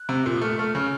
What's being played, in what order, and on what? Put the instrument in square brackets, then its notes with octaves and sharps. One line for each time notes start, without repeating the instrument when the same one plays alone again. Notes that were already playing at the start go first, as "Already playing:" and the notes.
Already playing: [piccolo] F#6
[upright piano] C3
A#2
[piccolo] D#6
[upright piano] A3 [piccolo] F6
[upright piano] A3 [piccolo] F6
[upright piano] C#3 [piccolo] F6